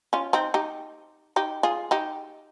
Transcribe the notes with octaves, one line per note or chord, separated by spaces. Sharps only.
C#4 F4
C4 D#4
D#4 G4
D#4 G4
F4 G#4
D#4 G4